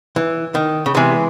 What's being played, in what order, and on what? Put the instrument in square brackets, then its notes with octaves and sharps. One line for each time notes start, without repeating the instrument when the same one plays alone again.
[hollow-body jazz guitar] E3
D#3
C#3
[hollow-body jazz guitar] C3 [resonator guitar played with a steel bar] E3 G#3 B3